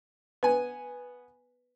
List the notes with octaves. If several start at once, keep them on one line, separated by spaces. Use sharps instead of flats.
B3 B4 G#5